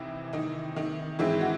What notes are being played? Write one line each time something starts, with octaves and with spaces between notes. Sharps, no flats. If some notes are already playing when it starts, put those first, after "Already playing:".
Already playing: C2 C3 D#3 E3 C4 E4
D#3 D#4
D#3 D#4
G#2 D#3 E3 G#3 C4 E4
F#4